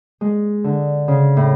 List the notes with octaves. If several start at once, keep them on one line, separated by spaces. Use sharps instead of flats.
G#3
D3
C#3
A2